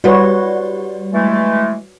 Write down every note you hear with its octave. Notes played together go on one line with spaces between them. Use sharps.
G3 F#4 G4 B4 C#5 D5
E3 G#3 A3